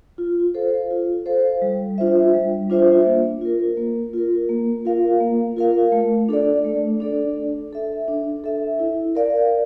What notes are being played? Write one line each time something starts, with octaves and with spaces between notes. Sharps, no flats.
F4
A4 C5 F5
F4
A4 C5 F5
G3
D4 F4 C5 E5
G3
D4 F4 C5 E5
A#3
F4 A#4
A#3
F4 A#4
A#3
F4 A#4 F5
A#3
F4 A#4 F5
A3
D4 A4 D5
A3
D4 A4 D5
D4
A4 E5
D4
A4 E5
E4
A#4 D5 F5